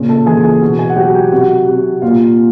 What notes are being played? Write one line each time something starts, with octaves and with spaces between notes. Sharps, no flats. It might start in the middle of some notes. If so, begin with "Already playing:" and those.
Already playing: A#2 C#3
A4 A5
E3 G#4 G#5
G#4 G#5
B2
G#4 G#5
F#5
F#3 G4 G5
G4 G5
C3 F#4 F#5
C3
A#2 F4 F5